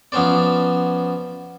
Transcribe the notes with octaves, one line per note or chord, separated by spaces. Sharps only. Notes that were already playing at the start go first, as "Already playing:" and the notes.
F3 B3 C#4 C5 D5